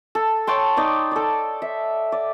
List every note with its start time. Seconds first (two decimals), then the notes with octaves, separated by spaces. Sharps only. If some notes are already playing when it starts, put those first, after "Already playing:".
0.15 A4
0.47 C#5 G5 A5 C6
0.77 D#4 D5 G5
1.11 A4 D5
1.62 E5
2.12 D5